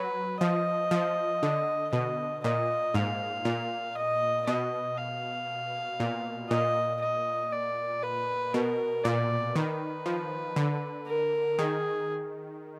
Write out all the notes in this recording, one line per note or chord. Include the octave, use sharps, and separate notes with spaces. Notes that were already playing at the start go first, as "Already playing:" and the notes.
Already playing: F#3 B4
F3 D#5
F3
D3
B2 D#5
A#2 D#5
G#2 F5
A#2
D#5
B2 D#5
F5
A#2
A#2 D#5
D#5
D5
B4
B2 A#4
A#2 D5
D#3 B4
F3
D3
A#4
D#3 G#4